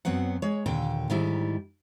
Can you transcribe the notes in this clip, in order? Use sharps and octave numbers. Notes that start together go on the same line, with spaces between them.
F#2 F#3 B3 C4 F#5
G#3 C#5
D#2 A#2 D3 G5
G#2 D#3 G3 E4